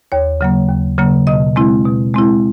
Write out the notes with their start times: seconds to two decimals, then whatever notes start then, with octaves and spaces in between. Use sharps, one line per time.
0.12 D#2 C#5
0.41 C#3 F#3 A#3
0.69 D#2
0.98 C#3 F#3 A#3
1.27 B2 D#5
1.56 G#3 C4 E4
1.85 B2
2.14 G#3 C4 E4